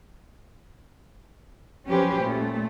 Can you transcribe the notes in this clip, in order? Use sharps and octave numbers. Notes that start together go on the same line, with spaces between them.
F3 F#3 C#4 G4 B4 C5
A#2 A3